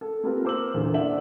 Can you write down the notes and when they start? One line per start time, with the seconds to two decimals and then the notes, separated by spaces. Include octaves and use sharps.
0.01 A4
0.23 A#3 C4 F4 G4 A#4 B4
0.45 A#4 C5 D6 E6 F#7
0.74 E2 A#2 D3
0.94 D4 C5 D5 E5 F#5 F#7